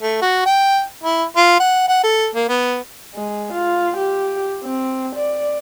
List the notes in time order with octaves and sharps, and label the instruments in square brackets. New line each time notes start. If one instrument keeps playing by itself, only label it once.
[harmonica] A3
F#4
G5
E4
F4
F#5
F#5
A4
A#3
B3
[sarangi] G#3
F4
G4
C4
D5